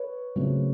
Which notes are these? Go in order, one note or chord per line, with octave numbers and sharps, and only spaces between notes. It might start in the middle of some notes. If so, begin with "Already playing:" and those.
Already playing: B4 C#5
C#3 F#3 A3 C4